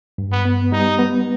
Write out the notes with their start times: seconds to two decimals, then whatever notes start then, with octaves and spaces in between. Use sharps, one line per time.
0.18 G2
0.32 B3
0.45 B3
0.72 G3 D#4
0.99 B3